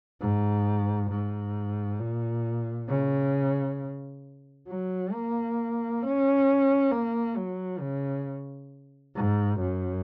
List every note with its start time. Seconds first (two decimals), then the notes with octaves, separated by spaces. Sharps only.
0.21 G#2
1.11 G#2
2.00 A#2
2.89 C#3
4.68 F#3
5.13 A#3
6.03 C#4
6.92 A#3
7.37 F#3
7.81 C#3
9.15 G#2
9.61 F#2